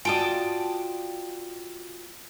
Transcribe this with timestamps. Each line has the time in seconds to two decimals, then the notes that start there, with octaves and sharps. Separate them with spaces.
0.05 F4 F#4 D5 G5 A5 D#6